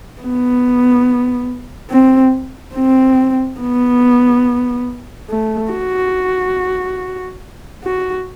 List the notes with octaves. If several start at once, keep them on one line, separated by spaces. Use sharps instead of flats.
B3
C4
C4
B3
A3
F#4
F#4